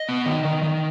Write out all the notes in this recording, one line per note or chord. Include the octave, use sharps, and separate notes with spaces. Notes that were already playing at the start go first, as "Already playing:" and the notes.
Already playing: D#5
B3
D#3
D#3
D#3